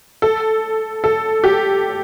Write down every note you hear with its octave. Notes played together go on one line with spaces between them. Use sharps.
A4
A4
G4